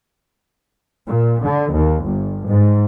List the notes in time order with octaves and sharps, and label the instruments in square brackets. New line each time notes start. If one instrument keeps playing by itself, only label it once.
[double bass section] A#2
D3
D#2
G1
G#2